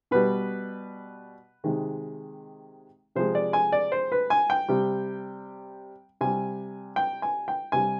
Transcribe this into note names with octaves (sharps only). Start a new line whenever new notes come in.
B2 G3 B4
C3 D#3 G#3
C3 F3 G#3 C5
D5
G#5
D5
C5
B4
G#5
G5
C3 G3
C3 G3 G#5
G5
G#5
G5
C3 G3 G#5